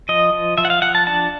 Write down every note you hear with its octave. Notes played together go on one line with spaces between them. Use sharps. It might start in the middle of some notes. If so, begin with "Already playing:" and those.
F3 D#5
F3
F3 E5
F#5
F5
F3 F#5
A5
D4 A5